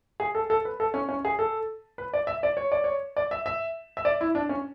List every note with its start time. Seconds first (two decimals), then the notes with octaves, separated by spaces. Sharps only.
0.20 G#4
0.35 A4
0.50 A4
0.65 B4
0.80 A4
0.94 C#4
1.09 C#4
1.25 G#4
1.39 A4
1.98 B4
2.14 D5
2.27 E5
2.43 D5
2.57 C#5
2.72 D5
2.84 C#5
3.17 D5
3.31 E5
3.46 E5
3.97 E5
4.05 D5
4.21 E4
4.35 D4
4.49 C#4